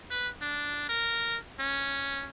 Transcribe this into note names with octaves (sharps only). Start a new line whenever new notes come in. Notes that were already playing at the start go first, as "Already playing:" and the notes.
B4
D4
A#4
C#4